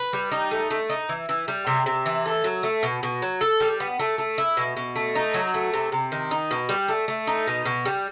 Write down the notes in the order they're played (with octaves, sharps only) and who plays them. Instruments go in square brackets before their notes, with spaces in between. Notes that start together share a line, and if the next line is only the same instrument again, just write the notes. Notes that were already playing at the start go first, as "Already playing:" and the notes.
Already playing: [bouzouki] B4
G3
D#4
A3
A3
D#4
E3
E3
G3
C3
C3
E3
A4
F#3
A3
B2
B2
F#3
A4
G3
B3
A3
A3
E4
B2
B2
A3
D#4
F#3
A3
C3
C3
D#3
D#4
B2
G3
A3
A3
D#4
B2
B2
G3